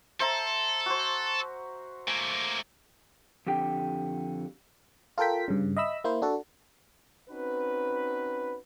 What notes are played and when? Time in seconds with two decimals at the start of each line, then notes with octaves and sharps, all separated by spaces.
0.20 A4 C5 E5 A#5
0.86 F#4 C5
2.08 A3 A#3 G#5
3.47 F2 D3 G4 G5
5.18 F4 A4 A#4 G5 B6
5.48 G2 C#3
5.77 D#5 E5 B5 E6
6.04 A#3 E4 C5
6.22 D4 F#4 A4
7.30 C4 C#4 D#4 F#4 B4